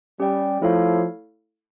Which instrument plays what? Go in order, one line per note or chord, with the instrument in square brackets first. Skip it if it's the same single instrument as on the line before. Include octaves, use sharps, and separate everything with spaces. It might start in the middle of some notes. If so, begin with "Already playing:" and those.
[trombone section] G3 [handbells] C#4 G4 D5 G5
[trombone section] F3 [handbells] A3 E4 A4 C#5 F5